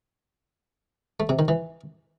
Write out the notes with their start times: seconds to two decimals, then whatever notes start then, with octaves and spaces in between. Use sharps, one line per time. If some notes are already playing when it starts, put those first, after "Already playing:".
1.20 A3
1.29 C3
1.39 D#3
1.48 E3